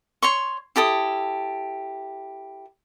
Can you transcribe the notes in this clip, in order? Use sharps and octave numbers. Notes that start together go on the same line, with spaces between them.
C#5 C6 C#6
E4 G4 A4 D#6